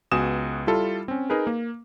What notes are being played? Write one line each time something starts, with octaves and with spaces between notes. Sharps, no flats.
C#2 B3 F#4 G#5 D#6 E7
G3 E4 F4 A4
C4 C#4
D#4 G#4 A#4 B4
A#3